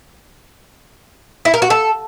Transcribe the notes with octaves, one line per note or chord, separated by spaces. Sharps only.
E4
A#4
F#4
A4